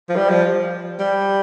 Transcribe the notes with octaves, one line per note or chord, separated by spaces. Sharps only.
F3
G3
F3
G3